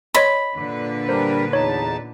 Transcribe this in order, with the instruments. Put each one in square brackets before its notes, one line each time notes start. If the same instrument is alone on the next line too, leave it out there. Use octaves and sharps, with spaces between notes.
[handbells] C#5 D#5 C6 [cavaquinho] B5
[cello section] A#2 D3 B4
[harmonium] G3 D4 A#4 [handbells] C5
[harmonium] E2 D#4 A5 [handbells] C#5